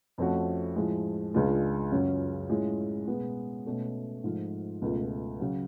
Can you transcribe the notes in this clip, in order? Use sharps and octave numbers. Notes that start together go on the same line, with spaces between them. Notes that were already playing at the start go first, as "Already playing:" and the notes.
F2 F3 A3 C#4 F#4
A2 F3 G#3
C#2 C#3 G#3 D4 F4
F#2 C#3 F#3 C#4 F4
A2 G#3 C#4 F4
B2 G#3 B3
B2 A3 C#4
G#2 F3 A3 F4
C#2 B2 A3 F4
C#3 F#3